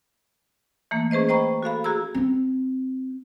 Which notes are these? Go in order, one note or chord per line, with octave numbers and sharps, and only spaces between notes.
E3 A3 A#3
C#4 G#4 B4 C5 D#5
C5 D#5 G5 A#5 B5 C#6
F#4 A4 F5 B5
F#4 G#4 A#5 E6
C4 F4